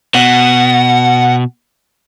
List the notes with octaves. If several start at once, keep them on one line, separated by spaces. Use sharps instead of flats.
B2 F#5